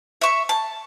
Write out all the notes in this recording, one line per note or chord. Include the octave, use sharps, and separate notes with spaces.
E5 C#6
A5